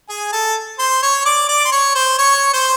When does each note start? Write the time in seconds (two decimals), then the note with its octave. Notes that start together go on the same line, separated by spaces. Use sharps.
0.10 G#4 G#5
0.33 A4 A5
0.79 C5 C6
1.03 C#5 C#6
1.26 D5 D6
1.49 D5 D6
1.66 C6
1.72 C#5 C#6
1.95 C5 C6
2.19 C#5 C#6
2.54 C5 C6